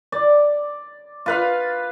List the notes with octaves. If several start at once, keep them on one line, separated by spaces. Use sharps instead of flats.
D5
F4 B4 F5